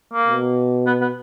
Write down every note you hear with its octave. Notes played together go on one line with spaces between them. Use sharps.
A#3
B2
B3
B3